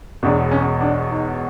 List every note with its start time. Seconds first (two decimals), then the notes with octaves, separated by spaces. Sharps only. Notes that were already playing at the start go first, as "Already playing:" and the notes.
0.23 E1 E2 B2 D4
0.51 C#4
0.81 D4
1.09 D#4